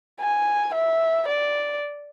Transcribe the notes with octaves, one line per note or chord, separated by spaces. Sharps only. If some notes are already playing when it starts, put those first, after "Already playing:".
G#5
E5
D5